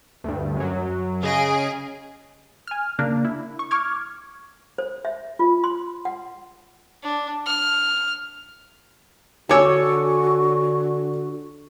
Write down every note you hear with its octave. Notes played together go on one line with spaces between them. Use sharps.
D2 G2
F#2 F#3
C#3 G#4 D#5 D7
G#5 F6
C#3 A#3 D4
E4
C#6
C#6 D6 F6 G#6
C5
E5
F4
C6
F#5
D4
F6
D3 F#4 A4 C#5 G#5 D6 E6